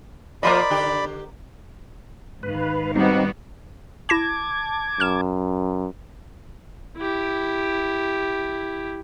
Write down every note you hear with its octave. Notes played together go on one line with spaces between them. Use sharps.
F3 A#3 F4 A#4 C5 D5 D#5 B5
D3 G4
G#2 D#3 B4 F5
G3 B3 C4 D#4 F#4
E4 A5 D6 G#6 A#6 E7
F#2 F6 E7
E4 G4